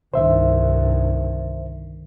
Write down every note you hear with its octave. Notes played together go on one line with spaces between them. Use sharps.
C2 G2 D3 D#3 C5 E5